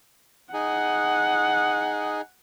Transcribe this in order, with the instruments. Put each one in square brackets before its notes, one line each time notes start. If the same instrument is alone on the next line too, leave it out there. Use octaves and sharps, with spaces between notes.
[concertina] D#4 G#4 [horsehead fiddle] F#5